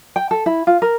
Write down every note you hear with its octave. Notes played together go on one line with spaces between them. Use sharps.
G5
A4
E4
F4
A#4